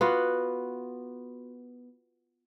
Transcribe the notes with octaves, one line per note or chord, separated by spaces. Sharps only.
B3 F4 F#4